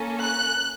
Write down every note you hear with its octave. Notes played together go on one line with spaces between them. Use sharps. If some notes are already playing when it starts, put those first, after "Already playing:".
Already playing: A#3 C#4 A4
F#6